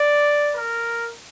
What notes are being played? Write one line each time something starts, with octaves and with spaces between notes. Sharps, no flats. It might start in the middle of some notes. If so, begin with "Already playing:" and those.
Already playing: D5
A#4